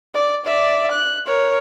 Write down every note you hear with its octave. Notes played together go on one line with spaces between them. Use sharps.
D5
D5 E5
F#6
A#4 C#5